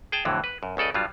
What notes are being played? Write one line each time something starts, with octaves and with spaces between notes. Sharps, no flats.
G#4 G5 A5
F2 A2 D3 E3 F#3
B4
F#2
C#2 C#3 A4 D5 D#5
G2 F#3 G3 F4